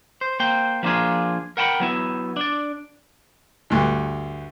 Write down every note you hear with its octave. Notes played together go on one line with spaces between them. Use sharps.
C5
A#3 C5 G5
F3 A#3 D4 F4 G#4
A#4 F#5 G5 A5 B5
F#3 B3 E4
D4 D5
D2 G2